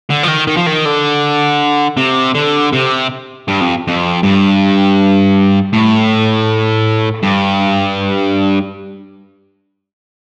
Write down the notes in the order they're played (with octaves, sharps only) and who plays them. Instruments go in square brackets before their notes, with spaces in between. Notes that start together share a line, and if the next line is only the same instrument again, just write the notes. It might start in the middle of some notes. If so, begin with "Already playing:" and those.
[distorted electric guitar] D3
F3
D#3
D#3
F3
D#3
D3
C3
D3
C3
G2
F2
F2
G2
A2
G2